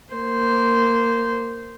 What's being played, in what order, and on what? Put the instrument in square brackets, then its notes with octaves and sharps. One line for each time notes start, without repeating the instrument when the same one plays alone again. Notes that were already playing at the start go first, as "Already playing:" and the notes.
[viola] A#3 C5